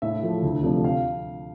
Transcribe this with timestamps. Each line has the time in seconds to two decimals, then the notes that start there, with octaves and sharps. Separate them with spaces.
0.02 A2 E5
0.23 F3 A3
0.43 D2
0.63 C3 F3 A3 D4
0.84 F5